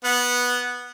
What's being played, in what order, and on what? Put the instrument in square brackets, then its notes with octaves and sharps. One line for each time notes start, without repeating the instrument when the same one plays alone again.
[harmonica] B3 F#5